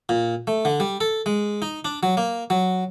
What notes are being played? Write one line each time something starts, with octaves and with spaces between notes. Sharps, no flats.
A#2
A3
D3
G3
A4
G#3
D#4
D4
F#3
A#3
F#3